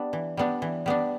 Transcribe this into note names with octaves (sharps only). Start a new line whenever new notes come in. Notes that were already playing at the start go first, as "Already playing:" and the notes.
Already playing: G3 B3 D4
E3
G3 B3 D4
E3
G3 B3 D4